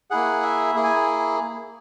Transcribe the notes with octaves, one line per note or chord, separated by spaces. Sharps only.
A#3 E4 G#4 F#5
E5
A#3 E4 G#4
G#5